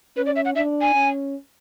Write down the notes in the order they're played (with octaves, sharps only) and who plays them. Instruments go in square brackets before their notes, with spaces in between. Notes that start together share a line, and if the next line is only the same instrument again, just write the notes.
[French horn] C#4 [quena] B4
[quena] D5
E5
F#5
[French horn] D4 [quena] E5
[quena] G#5
[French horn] C#4